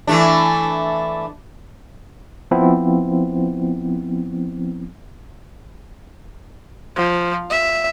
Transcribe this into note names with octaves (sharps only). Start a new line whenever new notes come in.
E3 A3 D4
F3 B3 C4 E4
F3
E5